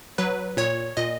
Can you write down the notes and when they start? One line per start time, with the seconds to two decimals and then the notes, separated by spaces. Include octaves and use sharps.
0.18 F#3 B4
0.57 A#2 C#5
0.97 A#2 D#5